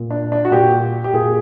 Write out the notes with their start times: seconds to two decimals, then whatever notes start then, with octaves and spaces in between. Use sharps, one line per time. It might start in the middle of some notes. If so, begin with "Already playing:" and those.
Already playing: A#2
0.10 D4
0.32 D4
0.45 F#4
0.51 A#2 G4
1.04 G4
1.13 A#2 G#4